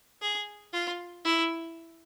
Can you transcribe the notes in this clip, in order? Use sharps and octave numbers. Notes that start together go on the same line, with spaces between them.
G#4
F4
E4